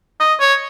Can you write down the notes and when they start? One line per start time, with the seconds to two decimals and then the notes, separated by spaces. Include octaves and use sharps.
0.20 D#5
0.40 C#5